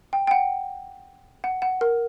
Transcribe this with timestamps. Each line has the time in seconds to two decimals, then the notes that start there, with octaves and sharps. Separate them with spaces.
0.13 G5
0.27 G5
0.31 F#5
1.44 F#5
1.62 F#5
1.81 A#4